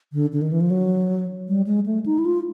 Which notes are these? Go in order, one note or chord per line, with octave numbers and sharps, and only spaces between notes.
D3
D3
D#3
E3
F3
F#3
G3
G#3
A3
D#4
E4
F4